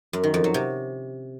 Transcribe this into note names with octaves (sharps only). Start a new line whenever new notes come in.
F#2
D#3
F2
F#3
C3